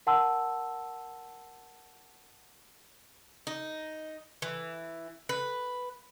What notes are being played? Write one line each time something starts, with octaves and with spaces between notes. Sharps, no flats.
A#4 F#5 A5 C6 E6
D#4
E3
B4